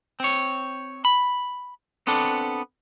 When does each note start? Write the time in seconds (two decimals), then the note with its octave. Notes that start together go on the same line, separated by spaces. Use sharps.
0.20 C4 C#5
1.05 B5
2.07 B3 C4 D4 A4